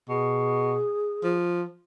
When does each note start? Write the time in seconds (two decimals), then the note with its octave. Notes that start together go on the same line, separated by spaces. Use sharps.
0.09 B2 G#4
1.24 F3